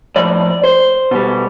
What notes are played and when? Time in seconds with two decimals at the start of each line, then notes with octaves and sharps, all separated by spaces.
0.16 A2 F3 D5
0.64 C5
1.11 B2 G3